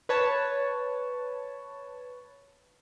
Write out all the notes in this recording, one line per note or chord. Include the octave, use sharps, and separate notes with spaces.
B4 C#5 A5